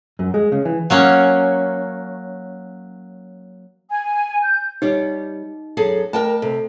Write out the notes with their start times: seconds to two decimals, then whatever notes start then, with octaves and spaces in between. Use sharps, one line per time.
0.19 F#2
0.34 G#3
0.52 C#3
0.65 E3
0.90 F#3 A#3 C#4
3.89 G#5
4.43 G6
4.82 G3 D#4 G4 C#5
5.77 F#2 G#4 A4
6.13 A3 A#4 G5 A5
6.42 C3 A4